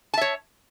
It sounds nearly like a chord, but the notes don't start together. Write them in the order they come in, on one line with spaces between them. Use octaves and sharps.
A5 E5 C#5